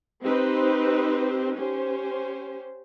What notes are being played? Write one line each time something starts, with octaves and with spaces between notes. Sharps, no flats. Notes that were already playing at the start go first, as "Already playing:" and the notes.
C4 D#4 G4 B4 C5
C#4 G4 C5